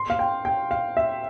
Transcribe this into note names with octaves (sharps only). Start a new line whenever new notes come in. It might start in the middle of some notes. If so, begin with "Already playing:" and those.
Already playing: C6
F5
G5
G5
F5
E5